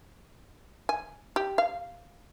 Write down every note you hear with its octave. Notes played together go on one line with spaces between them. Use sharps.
G#5
G4
F5